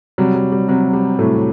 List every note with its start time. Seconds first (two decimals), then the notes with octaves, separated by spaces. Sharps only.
0.18 C3 F#3 G3
0.36 F#3
0.52 G3
0.68 C3 F#3
0.93 G3
1.19 A2 C3 F#3 A3